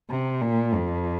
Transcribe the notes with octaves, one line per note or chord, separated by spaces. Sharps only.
C3
A#2
F2